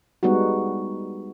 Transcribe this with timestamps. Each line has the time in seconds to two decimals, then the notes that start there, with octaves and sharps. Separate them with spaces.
0.23 G3 G#3 B3 D#4 F#4